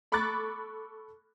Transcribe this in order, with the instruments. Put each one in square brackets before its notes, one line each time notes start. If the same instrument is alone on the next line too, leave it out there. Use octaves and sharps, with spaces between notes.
[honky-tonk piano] A4 B5 C#6 D6 F#6 A6